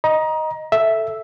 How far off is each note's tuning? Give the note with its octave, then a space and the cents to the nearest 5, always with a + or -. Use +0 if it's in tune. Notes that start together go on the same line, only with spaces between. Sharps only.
D#5 +0 A#5 +25
A4 +0 E5 +0